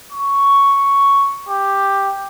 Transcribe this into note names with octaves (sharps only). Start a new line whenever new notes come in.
C#6
G4